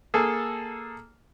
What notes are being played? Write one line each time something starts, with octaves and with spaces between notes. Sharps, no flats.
A#3 G#4 A4